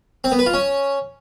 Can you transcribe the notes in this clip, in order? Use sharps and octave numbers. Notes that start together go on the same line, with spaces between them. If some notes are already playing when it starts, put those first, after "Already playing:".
C4
B3
B4
F4
C#4